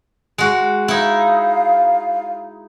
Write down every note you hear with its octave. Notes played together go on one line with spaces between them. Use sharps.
G#3 F#4
D#4 E4 F5